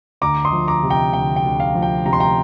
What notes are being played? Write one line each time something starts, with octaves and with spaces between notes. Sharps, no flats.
D2 A#5 D6
C6 D#6
F3
A#5 D6
C3
G5 A#5
D2 G5
G5
D2
F5
F3
G5
C3 A#5
C6
G5 A#5